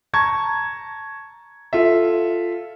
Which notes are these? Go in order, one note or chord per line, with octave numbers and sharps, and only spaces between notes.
A5 A#5 C#6 G#6
F4 A4 E5